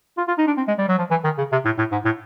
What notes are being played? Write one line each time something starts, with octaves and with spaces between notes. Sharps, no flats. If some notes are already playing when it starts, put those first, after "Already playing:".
F4
F4
D#4
D4
C4
G#3
G3
F#3
F3
E3
D#3
C#3
C3
A2
A2
G#2
A2